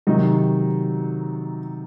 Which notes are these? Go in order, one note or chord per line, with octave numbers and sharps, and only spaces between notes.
C3 D#3 F#3 D#4